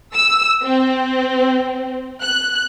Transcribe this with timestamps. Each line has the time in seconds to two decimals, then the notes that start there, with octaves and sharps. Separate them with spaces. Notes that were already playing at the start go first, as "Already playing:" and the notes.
0.14 E6
0.62 C4
2.22 F#6